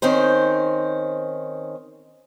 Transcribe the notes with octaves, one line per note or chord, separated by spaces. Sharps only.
D#3 C4 C#4 C5